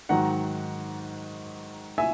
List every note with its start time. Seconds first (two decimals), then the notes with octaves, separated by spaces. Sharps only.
0.09 G#2 D#3 F#3 F#5 A#5
1.98 E5 G#5